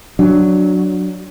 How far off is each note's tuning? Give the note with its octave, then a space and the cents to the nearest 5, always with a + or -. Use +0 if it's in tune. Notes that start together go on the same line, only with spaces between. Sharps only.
F#3 +0 D4 +0